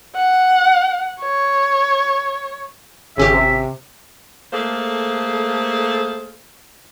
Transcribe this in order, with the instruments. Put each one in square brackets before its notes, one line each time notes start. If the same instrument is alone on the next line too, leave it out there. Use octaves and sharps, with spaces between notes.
[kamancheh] F#5
C#5
[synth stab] G#1 C#4 G4 [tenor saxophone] C#3 [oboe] E5
[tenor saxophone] C3
[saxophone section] A3 A#3 G#4 A4 C5 F5